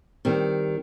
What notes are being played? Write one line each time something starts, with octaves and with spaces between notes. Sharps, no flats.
D#3 G3 C4